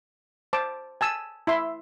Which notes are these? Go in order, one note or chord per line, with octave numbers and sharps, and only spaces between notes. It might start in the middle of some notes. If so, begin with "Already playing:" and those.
C5 A5 D6
G#5 A5 E6
E4 E5 C6